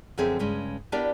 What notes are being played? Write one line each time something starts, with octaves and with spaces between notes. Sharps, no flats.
F#2 D3 F3 C4 G#4 E5
G2 C#3 G#3 C#4
B3 D4 E4 G4 A#4 D5